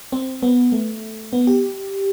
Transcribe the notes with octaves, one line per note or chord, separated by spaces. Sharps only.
C4
B3
A3
B3
G4